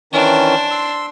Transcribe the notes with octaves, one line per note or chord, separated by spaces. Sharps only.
D#3 E3 C#4 D4 C5
C6 E6